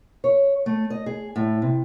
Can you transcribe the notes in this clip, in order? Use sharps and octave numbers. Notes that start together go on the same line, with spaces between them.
C#5
A3
D#5
G#4
A2
C3